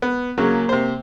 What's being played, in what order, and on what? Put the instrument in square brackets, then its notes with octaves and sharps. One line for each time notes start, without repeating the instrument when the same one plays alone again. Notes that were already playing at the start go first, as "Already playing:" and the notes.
[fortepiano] B3
[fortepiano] C#3 F#3 [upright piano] A#3
[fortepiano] C3 C5